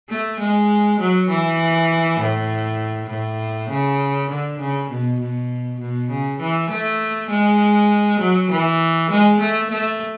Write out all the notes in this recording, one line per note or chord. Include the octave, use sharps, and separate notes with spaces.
A3
G#3
F#3
E3
A2
A2
C#3
D3
C#3
B2
B2
B2
C#3
E3
A3
G#3
F#3
E3
G#3
A3
A3